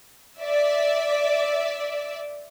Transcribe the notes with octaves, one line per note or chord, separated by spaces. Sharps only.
D5 E5